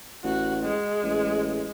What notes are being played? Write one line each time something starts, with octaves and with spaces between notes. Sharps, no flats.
A1 F#4
G#3
A1